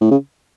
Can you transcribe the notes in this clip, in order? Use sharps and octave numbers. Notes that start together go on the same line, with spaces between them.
A2
C#3